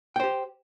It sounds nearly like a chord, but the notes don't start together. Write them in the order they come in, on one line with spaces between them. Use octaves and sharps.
G5 C5 G4